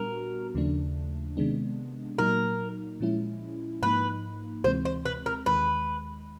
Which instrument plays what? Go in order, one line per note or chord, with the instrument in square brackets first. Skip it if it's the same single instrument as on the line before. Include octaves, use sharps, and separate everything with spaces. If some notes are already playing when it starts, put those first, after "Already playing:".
Already playing: [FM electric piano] A#2 G3 B3 D4 F#4 [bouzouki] A#4
[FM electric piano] D#2 C#3 F3 A3 D4
C3 D#3 G#3 B3 D4
[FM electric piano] A#2 F#3 A#3 D#4 [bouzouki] A#4
[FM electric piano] A#2 F3 G#3 C#4 E4
[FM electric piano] G#2 F3 A#3 D#4 [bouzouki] B4
[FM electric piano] D2 C3 E3 G#3 C4 [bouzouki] C5
[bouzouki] C5
B4
A#4
[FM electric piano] D#2 D#3 G#3 [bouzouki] B4